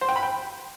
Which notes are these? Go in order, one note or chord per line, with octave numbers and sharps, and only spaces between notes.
C5
G5
B5
G5